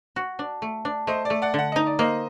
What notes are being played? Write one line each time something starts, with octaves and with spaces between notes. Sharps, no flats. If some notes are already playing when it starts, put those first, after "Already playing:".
F#4
D4
A3
D4
A3 C5 D#5
A3 D5
D5 F#5
D3 F#5
D#4 D#5
D5
A#3 C5 D#5